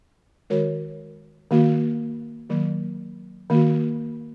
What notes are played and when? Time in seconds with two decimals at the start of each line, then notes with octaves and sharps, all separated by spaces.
0.50 D#3 G#3 F#4 A#4 C#5
1.51 D#3 A#3 F#4
2.50 D#3 F#3 A#3
3.50 D#3 A#3 F#4